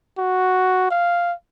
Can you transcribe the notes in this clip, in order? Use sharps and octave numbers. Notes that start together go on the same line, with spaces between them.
F#4
F5